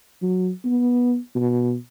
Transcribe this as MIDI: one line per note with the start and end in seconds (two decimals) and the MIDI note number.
0.22 0.51 54
0.65 1.17 59
1.36 1.74 47